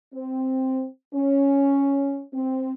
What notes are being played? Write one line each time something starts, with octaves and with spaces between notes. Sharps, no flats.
C4
C#4
C4